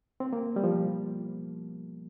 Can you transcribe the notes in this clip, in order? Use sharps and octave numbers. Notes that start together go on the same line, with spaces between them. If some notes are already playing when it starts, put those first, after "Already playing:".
C4
A#3
G3
F3